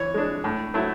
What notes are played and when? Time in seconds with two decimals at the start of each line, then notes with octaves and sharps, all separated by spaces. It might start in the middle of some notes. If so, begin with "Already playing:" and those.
Already playing: E3 C#5
0.14 G#3 D4
0.44 A2
0.74 F#3 A3 E4